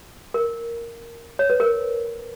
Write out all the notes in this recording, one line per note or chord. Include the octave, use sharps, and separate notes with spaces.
A#4
C#5
B4
A#4